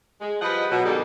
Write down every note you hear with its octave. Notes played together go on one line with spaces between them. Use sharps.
G#3
F3 G3 B4 D#5 F#5
B2 F#3
G#2 B2 D#3 G3 D4 A4